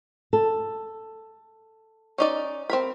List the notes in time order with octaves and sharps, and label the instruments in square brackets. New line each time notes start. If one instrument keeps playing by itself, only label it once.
[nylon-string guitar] A4
[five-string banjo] C#4 D#4 D5
C4 A#4 B5